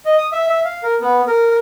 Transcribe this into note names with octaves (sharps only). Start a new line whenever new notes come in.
D#5
D#6
E5
E5
F5
A#4
B3
A#4